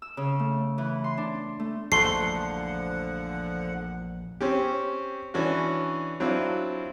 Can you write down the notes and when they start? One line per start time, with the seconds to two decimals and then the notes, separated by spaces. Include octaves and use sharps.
0.02 E6
0.17 C#3
0.39 A3
0.78 E3
1.04 C6
1.17 D4
1.60 A3
1.92 A#1 E2 D3 F3 A3 F#5 C6 C7
4.41 C4 C#4 G4
5.34 E3 C#4 D4 F#4
6.20 F#3 C4 D4 E4 F4